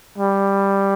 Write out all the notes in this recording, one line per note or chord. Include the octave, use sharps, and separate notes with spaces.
G3